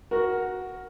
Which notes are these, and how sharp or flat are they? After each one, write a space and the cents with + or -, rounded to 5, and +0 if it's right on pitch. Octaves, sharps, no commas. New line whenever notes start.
F#4 +0 A#4 +10